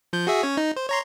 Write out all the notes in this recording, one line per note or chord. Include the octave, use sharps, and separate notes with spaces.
F3 G6
F#4 G#4 E5
C#4 C#5
D#4
C5
C#5 A#5 C6